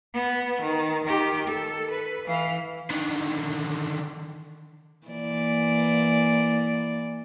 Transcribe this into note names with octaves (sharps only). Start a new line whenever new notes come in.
B3
D#3
D#3 G4
A4
B4
E3 F5
D3 D#3
E3 A#3 D5